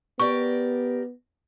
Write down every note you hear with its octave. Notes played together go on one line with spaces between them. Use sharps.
B3 G4 A#4 D5 C#6